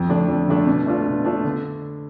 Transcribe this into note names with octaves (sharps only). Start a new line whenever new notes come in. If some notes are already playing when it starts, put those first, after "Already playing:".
Already playing: F2
D3 A3 D4
F2
D3 A3 D4
B2
A3 D4 F4
B2
A3 D4 F4
D3